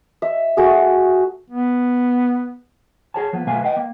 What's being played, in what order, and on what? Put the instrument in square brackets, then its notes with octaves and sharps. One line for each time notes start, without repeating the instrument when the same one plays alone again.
[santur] E5
A3 F#4 G#4
[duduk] B3
[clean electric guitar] G#4 C#5 A5
F3 A#3 B3
B1 B2 A3 B4 F5 G#5
B4 D#5 F5 G5
A#3